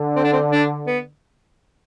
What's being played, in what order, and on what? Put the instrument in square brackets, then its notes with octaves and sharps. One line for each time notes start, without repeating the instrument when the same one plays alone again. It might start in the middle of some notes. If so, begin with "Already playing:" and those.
Already playing: [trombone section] D3
[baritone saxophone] C4
D4
C4
D4
B3